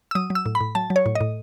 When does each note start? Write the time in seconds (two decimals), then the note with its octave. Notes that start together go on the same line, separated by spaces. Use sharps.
0.11 E6
0.15 F#3 D#6
0.30 F#3
0.35 E6
0.46 A2
0.55 B5
0.61 A2
0.75 F#3 A5
0.90 F#3
0.96 C#5
1.06 A2
1.15 D#5
1.21 A2